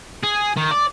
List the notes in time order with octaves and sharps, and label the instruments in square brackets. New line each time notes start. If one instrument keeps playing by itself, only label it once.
[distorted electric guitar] G#4
D#3
D5